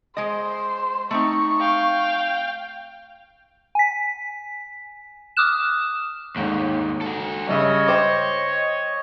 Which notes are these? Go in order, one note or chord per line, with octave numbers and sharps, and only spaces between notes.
G#3 C5 D#5
A3 C4 D#4 C#6
F5 G5
G#5 B6
D6 D#6 F6 F#6 E7
G1 D#2 G#2
F#4 A4
G2 C#3 C#5 D#5 E5
C5 G5 D6